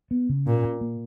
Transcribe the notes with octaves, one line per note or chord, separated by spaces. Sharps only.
B3
C#3
A#2 C#4
A#2
A#3